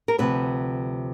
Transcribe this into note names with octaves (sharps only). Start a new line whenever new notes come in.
A#4
D2 C3 F3 B4